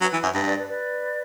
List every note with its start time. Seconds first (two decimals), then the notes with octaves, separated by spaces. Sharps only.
0.01 F#3 B4
0.13 E3
0.23 F#2
0.34 G2 B4
0.45 B4 D5
0.56 B4 D5
0.68 B4 D5